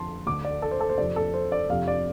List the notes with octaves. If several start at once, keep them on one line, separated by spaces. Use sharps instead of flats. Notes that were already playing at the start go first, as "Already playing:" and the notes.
Already playing: F2 D3 A5 C6
D2 D3 D6
D5
A4
C5
A4
C5
F2 C3 D5
A4
C5
D5
F2 C3 F5
D5